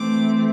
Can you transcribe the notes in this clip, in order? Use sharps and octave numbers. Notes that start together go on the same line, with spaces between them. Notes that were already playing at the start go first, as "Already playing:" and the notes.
Already playing: E3 A3 C4 D6